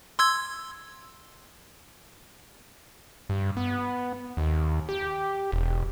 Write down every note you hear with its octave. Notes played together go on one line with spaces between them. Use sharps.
C6 E6 G#6
G2
B3
D#2
G4
E1